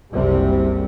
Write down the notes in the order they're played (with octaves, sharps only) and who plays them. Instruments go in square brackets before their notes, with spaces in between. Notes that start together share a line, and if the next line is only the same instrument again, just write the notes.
[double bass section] F#1 C2 C3 G3